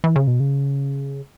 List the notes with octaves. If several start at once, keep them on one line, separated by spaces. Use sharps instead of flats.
E3
C#3
B2
C#3